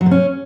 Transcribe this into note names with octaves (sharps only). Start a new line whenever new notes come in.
F#3
C3
C#4